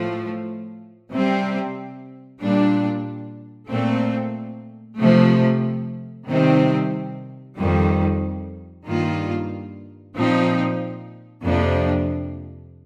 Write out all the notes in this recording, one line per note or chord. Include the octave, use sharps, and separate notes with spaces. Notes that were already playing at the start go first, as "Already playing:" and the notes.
Already playing: A2 F3 A3
C3 G3 C4
A#2 G3 D4
A#2 A3 C4
C3 F3 A3
C3 D#3 G3 C4
F2 D#3 G3
G2 D#3 A#3 F4
A#2 F3 C4 D#4
F2 C3 F3 A#3 D4